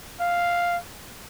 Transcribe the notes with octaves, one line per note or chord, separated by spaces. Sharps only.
F5